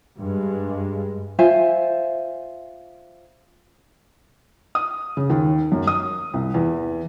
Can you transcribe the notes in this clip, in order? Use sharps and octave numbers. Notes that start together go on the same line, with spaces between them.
G2 G#3
F4 C5 E5 G#5
D#6
C#3
D#2
F#2
D#6
C2
E2